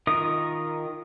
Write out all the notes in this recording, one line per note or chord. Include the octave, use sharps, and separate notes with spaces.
D#3 F4 A#4 D#5 D#6